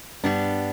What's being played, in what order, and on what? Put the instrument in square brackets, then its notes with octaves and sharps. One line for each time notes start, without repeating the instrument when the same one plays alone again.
[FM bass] G2 [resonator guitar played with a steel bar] G3 B3 D4